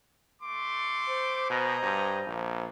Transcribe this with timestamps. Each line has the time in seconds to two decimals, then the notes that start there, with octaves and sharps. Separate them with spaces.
0.42 A3 C6 D6
1.08 C5
1.50 B2 D#5 G#5 A#5
1.82 G2
2.27 A#1